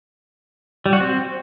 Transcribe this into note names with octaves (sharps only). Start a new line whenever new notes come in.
G3
F#4
C4